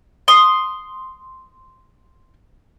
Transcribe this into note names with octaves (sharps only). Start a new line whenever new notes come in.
C6 D#6